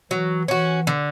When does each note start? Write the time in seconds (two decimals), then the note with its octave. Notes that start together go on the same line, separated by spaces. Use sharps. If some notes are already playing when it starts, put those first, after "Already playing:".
0.11 E3 F#3
0.48 E3 C#4 F#4
0.87 D3